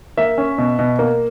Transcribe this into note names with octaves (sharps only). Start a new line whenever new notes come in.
A#3 E5
C#4
B2
B2
A#3